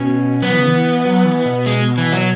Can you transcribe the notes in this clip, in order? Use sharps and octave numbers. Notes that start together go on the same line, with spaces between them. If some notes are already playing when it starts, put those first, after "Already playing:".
Already playing: B2 C#4
F#3 B3
E3
C#3
E3
F#3
E3
B2
G#3
E3
F#3